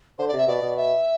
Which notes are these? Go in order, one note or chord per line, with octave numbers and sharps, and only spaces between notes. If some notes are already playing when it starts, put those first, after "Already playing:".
D3 C5
D5
C3 E5
B2 D5
B2
E5